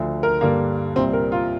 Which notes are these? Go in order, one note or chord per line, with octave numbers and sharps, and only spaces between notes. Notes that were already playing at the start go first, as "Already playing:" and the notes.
Already playing: D2 D3 F3
A#4
G2 D3 G3 A#3
C2 A#2 G3 C4
A#4
F4